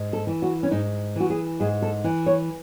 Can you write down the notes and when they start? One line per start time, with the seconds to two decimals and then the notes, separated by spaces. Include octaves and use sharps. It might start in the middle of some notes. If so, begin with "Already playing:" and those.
Already playing: G#2
0.13 A4
0.27 E3
0.42 F#4
0.63 C#4
0.71 G#2 D#4
1.16 E3 F#4
1.30 G#4
1.60 G#2 G#4
1.82 A4
2.04 E3
2.26 C#5